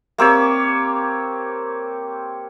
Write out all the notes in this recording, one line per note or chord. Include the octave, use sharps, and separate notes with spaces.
A#3 C4 G4 C#5